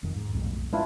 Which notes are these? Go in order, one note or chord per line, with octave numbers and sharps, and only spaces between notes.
E1 F2 D#3
G#2
B1 F2 A2
G#3 D4 E4 F4